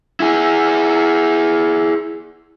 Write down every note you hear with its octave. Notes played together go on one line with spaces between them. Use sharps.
E4 G#4